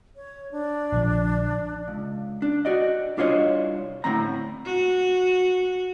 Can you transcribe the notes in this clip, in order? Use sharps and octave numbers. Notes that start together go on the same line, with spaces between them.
C#5
D4
A#1 D3 F3
C#2
D4
F#4 D5 D#5
C2 D4 F4 C5 C#5 D#5
A2 D3 C4 A#5
F#4